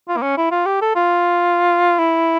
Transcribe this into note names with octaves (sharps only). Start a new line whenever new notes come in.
F4
A#3
C#4
E4
F4
G4
A4
F4
E4